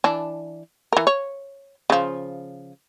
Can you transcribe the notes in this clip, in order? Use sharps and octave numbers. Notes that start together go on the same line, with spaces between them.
E3 D4
E3 A#4
C#5
C#3 F3